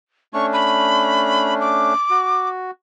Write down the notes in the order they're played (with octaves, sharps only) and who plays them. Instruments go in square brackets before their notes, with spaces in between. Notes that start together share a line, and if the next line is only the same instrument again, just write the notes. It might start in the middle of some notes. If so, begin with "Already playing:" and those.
[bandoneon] A3 C#4 D4 [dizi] C#6
[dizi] B5
D6
[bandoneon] F#4